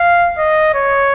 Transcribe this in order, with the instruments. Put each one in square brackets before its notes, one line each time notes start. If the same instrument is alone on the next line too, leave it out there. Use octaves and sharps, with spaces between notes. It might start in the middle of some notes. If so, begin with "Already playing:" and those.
Already playing: [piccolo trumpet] F5
D#5
C#5